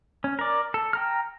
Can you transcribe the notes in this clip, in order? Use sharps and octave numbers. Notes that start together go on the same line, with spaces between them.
C#4
A#4 D5
A4
G5 A#5 F6